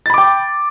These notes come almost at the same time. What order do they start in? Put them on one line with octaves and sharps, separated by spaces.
A6 B5 D6 G5